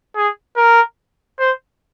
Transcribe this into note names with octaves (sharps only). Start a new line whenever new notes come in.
G#4
A#4
C5